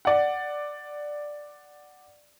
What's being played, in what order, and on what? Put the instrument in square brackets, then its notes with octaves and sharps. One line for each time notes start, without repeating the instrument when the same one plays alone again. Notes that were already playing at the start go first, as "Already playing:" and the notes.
[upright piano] D5 F#5